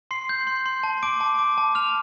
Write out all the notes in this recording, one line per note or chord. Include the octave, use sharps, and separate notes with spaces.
C6 C7
G6
C6
C6
A5
D6 D7
A5
D6
A5
F6 F7